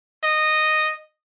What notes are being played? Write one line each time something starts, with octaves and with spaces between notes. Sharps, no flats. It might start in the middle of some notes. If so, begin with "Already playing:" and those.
D#5